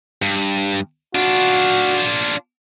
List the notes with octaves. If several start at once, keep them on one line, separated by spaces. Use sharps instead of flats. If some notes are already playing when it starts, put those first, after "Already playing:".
G2
D4 F4 F#4